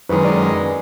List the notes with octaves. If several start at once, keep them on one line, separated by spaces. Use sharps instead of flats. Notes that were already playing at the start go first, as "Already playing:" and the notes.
F#2 D#3 G#3 B4
D5